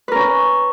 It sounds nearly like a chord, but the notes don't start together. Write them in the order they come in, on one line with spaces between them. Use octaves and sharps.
B4 A#4 C#4